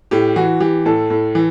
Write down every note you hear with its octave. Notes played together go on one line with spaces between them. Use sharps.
A2 G4
E3 F#4
E3 G4
A2 A4
A2
E3